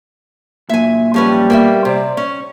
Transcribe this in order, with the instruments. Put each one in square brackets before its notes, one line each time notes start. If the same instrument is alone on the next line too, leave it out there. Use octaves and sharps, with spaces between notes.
[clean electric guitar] A#2 F#3 [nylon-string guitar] E5 G#5
[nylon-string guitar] F3 C#4 B4 [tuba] G3
[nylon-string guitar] A#3 B3 E5
[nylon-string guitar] C3 [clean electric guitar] C5 D5
[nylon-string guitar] C#4